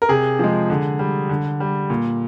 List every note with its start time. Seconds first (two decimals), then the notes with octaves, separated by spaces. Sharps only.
0.02 A#4
0.09 C3 G#4
0.39 F3 G#3
0.70 D3
0.99 G3
1.29 D3
1.60 G3
1.90 A#2